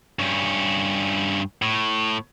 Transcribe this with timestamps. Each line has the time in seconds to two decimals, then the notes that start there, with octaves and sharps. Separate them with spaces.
0.19 G2 C#4
1.62 A2